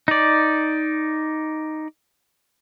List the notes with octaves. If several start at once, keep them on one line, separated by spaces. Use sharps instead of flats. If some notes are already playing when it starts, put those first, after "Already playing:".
D#4 D5